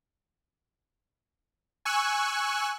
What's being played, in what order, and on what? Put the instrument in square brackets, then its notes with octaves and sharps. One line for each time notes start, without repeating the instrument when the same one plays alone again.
[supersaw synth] G#5 C#6 E6 F#6